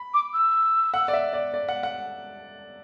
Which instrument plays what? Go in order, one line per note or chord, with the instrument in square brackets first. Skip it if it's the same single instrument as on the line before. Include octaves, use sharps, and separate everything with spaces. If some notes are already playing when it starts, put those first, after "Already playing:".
Already playing: [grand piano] B5
[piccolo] D6
E6
[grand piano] F#5
D5
E5
D5
D5
F#5
F#5